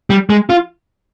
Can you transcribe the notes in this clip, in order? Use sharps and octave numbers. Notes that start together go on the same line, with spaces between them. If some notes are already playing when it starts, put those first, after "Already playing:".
G3
G#3
F4